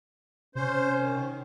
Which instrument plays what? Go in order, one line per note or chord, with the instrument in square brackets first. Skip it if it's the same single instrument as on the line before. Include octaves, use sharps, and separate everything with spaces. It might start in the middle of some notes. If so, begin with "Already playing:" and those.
[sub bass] C3 [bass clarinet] C#4 [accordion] C5
[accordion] D#3